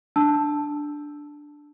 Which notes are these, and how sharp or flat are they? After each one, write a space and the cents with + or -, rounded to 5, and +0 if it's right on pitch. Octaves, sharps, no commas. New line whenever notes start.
D4 +0 A5 +0 E6 +0